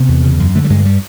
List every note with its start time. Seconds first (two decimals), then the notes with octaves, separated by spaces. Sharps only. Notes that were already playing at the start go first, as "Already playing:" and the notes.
Already playing: C3 B3
0.08 E2
0.23 C#3
0.39 F#2
0.55 D3 A3
0.64 G3
0.70 G2 G#3
0.86 G3